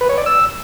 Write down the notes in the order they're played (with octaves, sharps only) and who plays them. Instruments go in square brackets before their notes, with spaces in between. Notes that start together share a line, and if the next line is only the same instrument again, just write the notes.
[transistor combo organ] B4
C#5
D5
E6